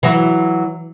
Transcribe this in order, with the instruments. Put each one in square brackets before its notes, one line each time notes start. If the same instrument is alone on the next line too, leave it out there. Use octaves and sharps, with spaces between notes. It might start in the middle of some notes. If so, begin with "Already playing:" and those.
[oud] E3 F#3 F#4